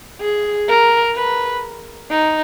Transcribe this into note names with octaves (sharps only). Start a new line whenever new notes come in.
G#4
A#4
B4
D#4